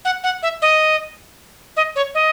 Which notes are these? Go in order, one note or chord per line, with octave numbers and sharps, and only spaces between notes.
F#5
F#5
E5
D#5
D#5
C#5
D#5